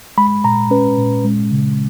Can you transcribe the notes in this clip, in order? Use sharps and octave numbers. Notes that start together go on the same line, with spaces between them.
G#3 B5
A#2 A#5
C#4 B4
A#2
G#3
C#3